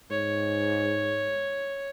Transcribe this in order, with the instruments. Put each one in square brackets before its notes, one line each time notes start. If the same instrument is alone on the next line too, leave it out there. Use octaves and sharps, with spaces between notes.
[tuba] G#2 [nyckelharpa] C#5